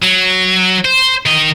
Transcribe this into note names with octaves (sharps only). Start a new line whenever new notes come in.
F#3
C5
D#3 D#5